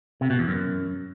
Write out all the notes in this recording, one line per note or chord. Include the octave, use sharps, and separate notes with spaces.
C3
B2
E2
F#2